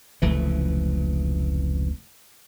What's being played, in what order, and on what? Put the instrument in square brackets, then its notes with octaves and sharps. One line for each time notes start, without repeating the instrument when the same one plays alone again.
[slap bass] F1 C#2 E3 A3